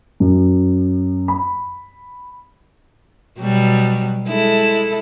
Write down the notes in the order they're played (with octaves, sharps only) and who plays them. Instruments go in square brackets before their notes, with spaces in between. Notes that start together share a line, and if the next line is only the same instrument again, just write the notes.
[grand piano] F#2
B5
[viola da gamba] B2 F#3 G3
G#3 E4 A4